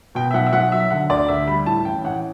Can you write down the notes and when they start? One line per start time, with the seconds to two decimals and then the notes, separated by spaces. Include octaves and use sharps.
0.15 B2 G5
0.31 E5
0.34 B1 F#5
0.46 E5
0.53 B1 F#5
0.72 F#3 E5
0.90 D3 F#5
1.10 D2 D5
1.28 D2 E5
1.47 G3 B5
1.66 A2 A5
1.85 A1 G5
2.04 A1 F#5